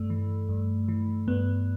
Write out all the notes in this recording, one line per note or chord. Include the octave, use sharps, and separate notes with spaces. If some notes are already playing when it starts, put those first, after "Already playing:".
Already playing: G2 A3
E3
G2
E3
G2 B3